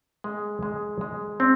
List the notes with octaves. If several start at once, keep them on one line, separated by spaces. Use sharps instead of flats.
G#3
G#3
G#3
C4